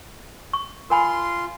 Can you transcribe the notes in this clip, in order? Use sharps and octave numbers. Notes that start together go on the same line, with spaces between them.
C#6
F4 A#4 G#5 B5 C6